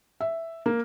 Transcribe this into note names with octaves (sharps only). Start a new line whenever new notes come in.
E5
A#3